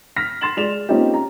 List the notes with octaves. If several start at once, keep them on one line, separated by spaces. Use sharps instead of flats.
F6 A#6 B6
C6 A6 E7 F#7
G#3 D5 E7 F7
A#3 C4 C#4 D#4 F4 G4
A#5